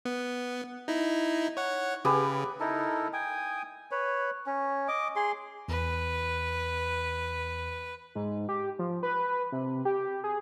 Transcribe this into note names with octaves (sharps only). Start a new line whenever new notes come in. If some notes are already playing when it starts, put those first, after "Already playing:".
B3
D#4 E4
C#5 F#5
C#3 G4 G#4 B4
D#4 E4 A4 A#4
G5 G#5 D#6
B4 C#5
C#4
D#5 D6
G#4 C6
E2 B4
G#2
G4
F3
B4
C3
G4
G#4